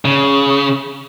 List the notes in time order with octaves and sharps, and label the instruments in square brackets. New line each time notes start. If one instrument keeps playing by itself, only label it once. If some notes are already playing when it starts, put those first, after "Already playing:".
[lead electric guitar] C#3